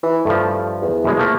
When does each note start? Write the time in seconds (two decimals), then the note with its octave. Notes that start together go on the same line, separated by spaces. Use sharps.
0.03 E3
0.25 G2 F3 A3
0.82 E2
1.04 F#2 B2 G#3
1.17 F3 A3 A#3